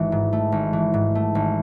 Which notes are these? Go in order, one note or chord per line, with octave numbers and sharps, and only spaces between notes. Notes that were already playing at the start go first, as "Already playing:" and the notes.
Already playing: G#1 E3
G#2
A3
G#1
E3
G#2
A3
G#1